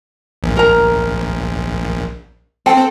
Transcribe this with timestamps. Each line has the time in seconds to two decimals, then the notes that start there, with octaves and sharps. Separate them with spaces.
0.43 A#1
0.57 A#4 A#5
2.66 C4 A4 G5